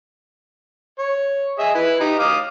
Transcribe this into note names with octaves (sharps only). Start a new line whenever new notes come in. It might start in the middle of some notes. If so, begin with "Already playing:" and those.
C#5
G#4 D#5 E5
E4 B4
D#4 G4
F5 D6 D#6